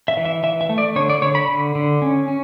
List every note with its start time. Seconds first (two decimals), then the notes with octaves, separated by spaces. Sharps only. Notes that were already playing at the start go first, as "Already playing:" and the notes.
0.08 E5
0.17 E3
0.25 E5
0.43 E3 E5
0.61 E5
0.69 A3
0.78 D5
0.96 D3 C#5
1.10 D5
1.22 D3 C#5
1.35 B5
1.48 D3
1.75 D3
2.02 C#4
2.28 C#4